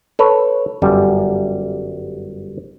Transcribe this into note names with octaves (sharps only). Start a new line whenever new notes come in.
A4 B4 C#5
G1 F#2 G3